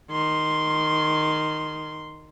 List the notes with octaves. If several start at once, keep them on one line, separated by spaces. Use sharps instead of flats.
D#3 C6